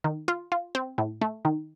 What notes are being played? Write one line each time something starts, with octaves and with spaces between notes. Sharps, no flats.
D#3
F4
F4
C4
A2
A3
D#3